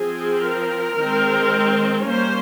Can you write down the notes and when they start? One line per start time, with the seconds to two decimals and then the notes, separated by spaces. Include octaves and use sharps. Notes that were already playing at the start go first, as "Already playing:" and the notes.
Already playing: F3 C4 G#4
0.45 A#4
0.99 D#3 G#3 C4
2.07 G3 A#3 C#4 C5